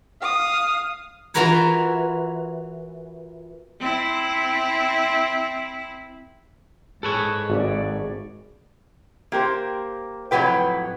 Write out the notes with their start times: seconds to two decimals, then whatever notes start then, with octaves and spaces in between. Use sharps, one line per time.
0.22 F5 D#6
1.34 E3 F4 F#4 A#4 B4 C#5
3.80 C4 E4
7.03 G#2 G#4 A4 B4 C#5
7.50 G#1 F#4 D5
9.32 A#3 G4 A#4 C5
10.31 F2 A2 F3 F#3 B4 G5